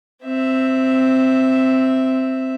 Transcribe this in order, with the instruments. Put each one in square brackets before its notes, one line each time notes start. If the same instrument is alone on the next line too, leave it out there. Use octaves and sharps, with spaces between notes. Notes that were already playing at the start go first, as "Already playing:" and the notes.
[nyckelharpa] C4 E5